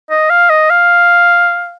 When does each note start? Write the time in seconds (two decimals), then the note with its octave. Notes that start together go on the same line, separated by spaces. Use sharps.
0.10 D#5
0.30 F5
0.50 D#5
0.70 F5